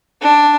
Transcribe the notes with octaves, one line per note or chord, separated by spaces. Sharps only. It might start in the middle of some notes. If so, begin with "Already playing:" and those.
D4